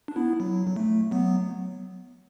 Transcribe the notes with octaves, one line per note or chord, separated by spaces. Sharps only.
D4
B3 E4
F#3
F#3
A3
F#3 B3